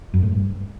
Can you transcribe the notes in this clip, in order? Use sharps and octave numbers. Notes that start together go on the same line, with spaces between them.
F#2
A2
G2